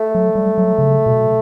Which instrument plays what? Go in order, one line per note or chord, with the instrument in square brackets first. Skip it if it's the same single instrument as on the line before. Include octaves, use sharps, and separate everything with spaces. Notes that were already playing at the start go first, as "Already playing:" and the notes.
Already playing: [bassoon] A3
[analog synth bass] F#3
G3
F#3
C#3
B2